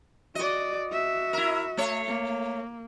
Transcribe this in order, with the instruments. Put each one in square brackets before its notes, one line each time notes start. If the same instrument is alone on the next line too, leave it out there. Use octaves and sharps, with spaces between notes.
[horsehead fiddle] F#4 D5 [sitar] D#5
[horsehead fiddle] F#4 E5
[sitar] E4 A#4
A3 C#5
[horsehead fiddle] A#3